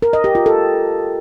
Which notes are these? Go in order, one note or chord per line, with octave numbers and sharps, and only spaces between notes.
A#4
D#5
G4
F4
A4